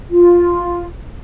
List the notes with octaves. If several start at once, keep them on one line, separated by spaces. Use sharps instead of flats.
F4